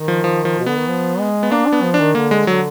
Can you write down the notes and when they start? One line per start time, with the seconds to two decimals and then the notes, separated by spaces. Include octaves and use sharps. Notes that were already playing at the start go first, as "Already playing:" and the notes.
Already playing: D#3
0.08 F3
0.24 F3
0.45 F3
0.59 B2
0.66 D3 B3
0.78 D#3
0.87 F3
1.19 G#3
1.43 B3
1.51 A#3 D4
1.67 D4
1.73 B3
1.83 F3
1.94 D4
1.99 D#3
2.15 D3 A#3
2.31 G#3
2.47 D3 F#3